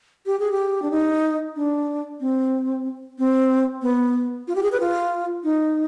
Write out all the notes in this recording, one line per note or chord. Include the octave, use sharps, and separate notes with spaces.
G4
G#4
G4
D4
D#4
D4
C4
C4
B3
F4
G4
G#4
B4
F4
D#4